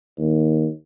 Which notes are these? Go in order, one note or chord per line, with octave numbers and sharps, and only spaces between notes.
D#2